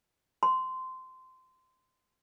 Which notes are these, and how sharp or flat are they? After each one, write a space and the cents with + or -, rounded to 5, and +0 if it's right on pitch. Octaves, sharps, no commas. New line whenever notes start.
C6 -15